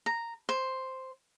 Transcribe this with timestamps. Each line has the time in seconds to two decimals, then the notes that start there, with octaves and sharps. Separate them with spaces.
0.06 A#5
0.49 C5